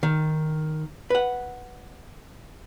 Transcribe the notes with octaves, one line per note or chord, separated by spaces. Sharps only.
D#3
B4 F#5